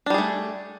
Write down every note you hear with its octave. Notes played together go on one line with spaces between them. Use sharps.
G3 A3 D4 G#4